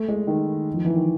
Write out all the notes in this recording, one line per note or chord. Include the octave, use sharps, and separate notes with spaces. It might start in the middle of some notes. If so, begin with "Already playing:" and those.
Already playing: A3
G#3
D#3
F3
E3
D#3